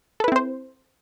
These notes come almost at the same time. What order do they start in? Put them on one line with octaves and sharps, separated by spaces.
A4 B4 E4 C4 C5